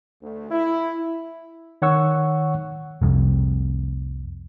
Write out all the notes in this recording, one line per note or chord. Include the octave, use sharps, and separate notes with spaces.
D2
E4
D#3 C#5 F#5 C#6 E6
F1 C2 F2